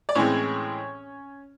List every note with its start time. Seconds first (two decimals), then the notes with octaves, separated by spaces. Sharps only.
0.09 D5
0.15 A2 E3 G#3 C4 C#4 C#5